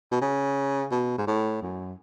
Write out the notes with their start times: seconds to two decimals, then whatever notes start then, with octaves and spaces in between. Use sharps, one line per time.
0.11 B2
0.21 C#3
0.91 B2
1.18 G#2
1.27 A2
1.62 F#2